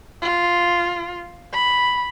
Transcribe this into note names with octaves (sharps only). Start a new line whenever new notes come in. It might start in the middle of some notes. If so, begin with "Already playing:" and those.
F4
B5